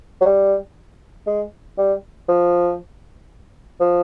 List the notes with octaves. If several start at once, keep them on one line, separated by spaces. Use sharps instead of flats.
F#3
G3
G#3
G3
F3
F3